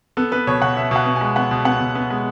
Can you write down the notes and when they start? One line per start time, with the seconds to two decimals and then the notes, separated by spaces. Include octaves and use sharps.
0.17 B3 A4
0.32 B3 B4
0.47 B2 C#5
0.62 B2 F#5
0.77 B2 E5
0.91 B2 F#5
1.06 B3
1.16 G#5
1.21 G#3
1.36 B3 F#5
1.51 B2
1.65 B3 F#5
1.80 B2
1.95 B3
2.10 G#3